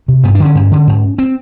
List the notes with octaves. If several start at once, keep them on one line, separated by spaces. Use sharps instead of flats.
C3
G2 B3
D4
D3 C#4
G2
D3
G#2
C4